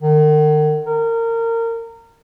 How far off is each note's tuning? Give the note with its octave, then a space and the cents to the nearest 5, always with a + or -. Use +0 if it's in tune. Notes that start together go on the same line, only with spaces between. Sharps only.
D#3 -40
A#4 -25